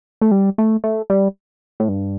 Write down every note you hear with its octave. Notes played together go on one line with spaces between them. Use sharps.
A3
G3
A3
A3
G3
A2
G2